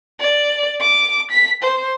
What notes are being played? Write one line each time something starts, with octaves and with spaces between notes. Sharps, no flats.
D5
D6
B6
C5